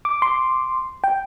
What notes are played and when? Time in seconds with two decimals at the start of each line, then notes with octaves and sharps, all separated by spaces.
0.05 D6
0.22 C6
1.04 G5